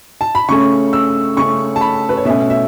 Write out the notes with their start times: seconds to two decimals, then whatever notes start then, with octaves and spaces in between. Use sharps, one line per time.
0.21 A5
0.35 B5
0.48 C#3 A3 C#4 C#6
0.93 E6
1.37 C#3 A3 C#4 C#6
1.76 A5
1.81 B5
2.09 B4
2.17 C#5
2.25 B2 A3 C#4 E5
2.50 E5